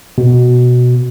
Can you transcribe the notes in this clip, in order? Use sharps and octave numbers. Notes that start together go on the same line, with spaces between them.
B2